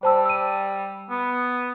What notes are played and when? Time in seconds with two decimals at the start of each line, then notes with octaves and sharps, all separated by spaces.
0.03 G3 C5 A5 E6
0.25 E6 D#7
1.10 B3